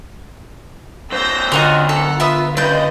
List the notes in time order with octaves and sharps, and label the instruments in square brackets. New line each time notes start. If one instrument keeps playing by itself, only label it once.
[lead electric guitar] F#2 C5 [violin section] E6 G6 A#6
[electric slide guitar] D3 A#4 [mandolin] F4 F#4 D#5
[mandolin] A4 [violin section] F#5
[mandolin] B3 E5 D#6 [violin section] F4
[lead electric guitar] F#2 C#3 [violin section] B4 D#5 [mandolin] D5 C6 G6